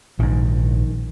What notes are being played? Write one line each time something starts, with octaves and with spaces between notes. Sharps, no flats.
A#1 G#2 D#3